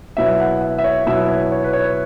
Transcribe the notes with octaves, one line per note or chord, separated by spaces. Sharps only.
B2 F#3 B3 E4 E5
F#5
E5
E5
C#5
B2 F#3 B3 E4 E5
C#5
C#5
B4
C#5